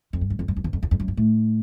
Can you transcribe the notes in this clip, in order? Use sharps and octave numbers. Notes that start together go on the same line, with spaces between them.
F2
G2
F#2
F2
F#2
F2
E2
F2
E2
F2
F#2
G2
A2